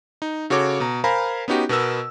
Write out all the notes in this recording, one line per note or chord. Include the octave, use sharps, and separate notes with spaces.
D#4
C#3 F#4 A4 C#5 D6
B2 A#5
A#4 C5 F5 G#5 A#5 B5
B3 C#4 D#4 F#4 G4
B2 B3 A#4 E6